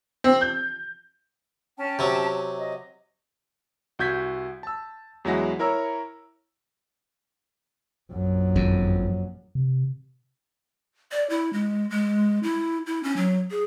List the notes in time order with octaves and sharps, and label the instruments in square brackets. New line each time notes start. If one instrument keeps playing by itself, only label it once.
[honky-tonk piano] C4
G6
[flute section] C#4 G5 A5
[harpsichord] C3 F#3
[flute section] D#5
[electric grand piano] C2 F#4 G6 G#6 B6
A5 E6
E2 F#3 G#3 E4 F#5 A#6
E4 A#4 C#5 A#5 E6
[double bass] A#1 F#2
[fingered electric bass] G#1 F2
[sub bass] C3
[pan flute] D5
E4
G#3
G#3
E4
E4
C#4
F#3
G#4